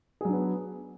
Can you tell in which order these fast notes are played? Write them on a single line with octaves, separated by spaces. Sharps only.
G#4 F#3 D4 B3